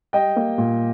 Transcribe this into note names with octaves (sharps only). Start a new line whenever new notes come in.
G3 D#5 G5
A#3
A#2